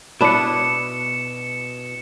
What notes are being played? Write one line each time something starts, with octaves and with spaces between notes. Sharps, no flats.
B2 D4 E4 B4 C#7 E7